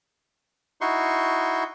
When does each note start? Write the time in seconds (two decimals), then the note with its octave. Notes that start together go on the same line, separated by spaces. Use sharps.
0.81 D#4 E4 F#4 C6 C#6